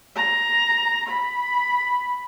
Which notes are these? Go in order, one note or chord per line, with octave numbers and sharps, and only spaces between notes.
A#5
B5